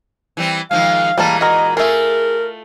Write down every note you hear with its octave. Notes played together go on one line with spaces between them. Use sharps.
E3 G3 C4
D#3 F3 G#3 F5
A#2 E3 G3 G#3 A#3 A5
F#4 A#4 D#5
A3 F4 G#4 A#4 E5